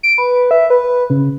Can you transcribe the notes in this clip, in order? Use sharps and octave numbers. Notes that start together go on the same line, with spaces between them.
D7
B4
E5
B4
C#3